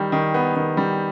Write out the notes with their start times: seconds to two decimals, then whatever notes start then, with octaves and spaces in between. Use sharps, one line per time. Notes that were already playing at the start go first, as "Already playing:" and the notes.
Already playing: D#3 G3
0.12 D#3
0.34 B3
0.56 D#3
0.77 G3